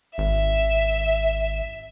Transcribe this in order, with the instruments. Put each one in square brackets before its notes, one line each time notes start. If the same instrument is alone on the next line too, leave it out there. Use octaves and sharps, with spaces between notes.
[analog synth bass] G#1 [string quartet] E5